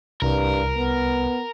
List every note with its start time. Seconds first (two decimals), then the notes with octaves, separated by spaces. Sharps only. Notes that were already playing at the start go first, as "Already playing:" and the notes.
0.22 C2 G2 A#4
0.77 B3